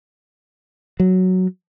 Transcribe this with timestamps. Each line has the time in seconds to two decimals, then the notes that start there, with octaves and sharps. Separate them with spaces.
1.00 F#3